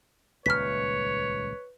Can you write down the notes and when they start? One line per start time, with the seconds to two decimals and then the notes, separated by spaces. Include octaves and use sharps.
0.46 D#1 C#2 B4 C#5 F6 B6